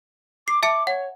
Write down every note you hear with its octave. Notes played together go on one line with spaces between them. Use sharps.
D6 C7
E5 A5 D6 C#7
C#5 F#5